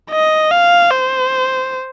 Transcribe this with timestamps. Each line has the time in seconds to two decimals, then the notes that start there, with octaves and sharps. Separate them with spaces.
0.10 D#5
0.51 F5
0.91 C5